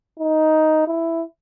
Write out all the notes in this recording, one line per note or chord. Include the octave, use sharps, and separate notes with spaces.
D#4
E4